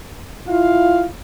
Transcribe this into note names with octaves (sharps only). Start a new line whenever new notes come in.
E4 F4 F5